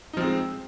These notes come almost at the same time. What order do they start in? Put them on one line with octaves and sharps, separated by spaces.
D#4 F3 C4 G#3